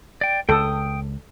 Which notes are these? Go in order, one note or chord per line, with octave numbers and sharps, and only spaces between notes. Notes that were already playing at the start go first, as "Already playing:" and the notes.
D5 G5
C#2 A4 G5 D#6